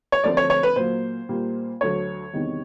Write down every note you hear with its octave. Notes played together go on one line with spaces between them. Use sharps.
C#5
D2 D3 F3 A3 C4 D5
C#5
C#5
B4
A#2 F#3 A#3 C5
A#2 G3 A#3
D2 D3 F#3 C#5
E2 C3 D#3 G3